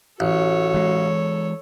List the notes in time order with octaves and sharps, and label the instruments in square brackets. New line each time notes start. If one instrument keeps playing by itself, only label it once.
[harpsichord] A1 [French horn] F#4 [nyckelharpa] A4 C#5
[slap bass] E3 G#3